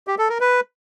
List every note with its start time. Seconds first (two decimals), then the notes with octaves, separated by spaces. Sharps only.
0.07 G4
0.18 A4
0.29 A#4
0.40 B4